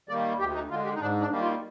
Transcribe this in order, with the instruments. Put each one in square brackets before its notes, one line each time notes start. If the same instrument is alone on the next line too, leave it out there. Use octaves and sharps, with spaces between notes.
[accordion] D#3 G3 A#3 D5
D2 G4
D#4
D3 G#3 F4
G4
D#4
G#2 D4
D4
D#3 G3 A#3
F4